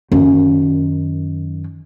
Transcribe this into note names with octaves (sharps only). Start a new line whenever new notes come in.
F#2 D#3